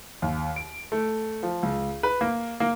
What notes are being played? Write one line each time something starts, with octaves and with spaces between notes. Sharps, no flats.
D#2
D7
A3
F3
C#2
B4
A#3
A#3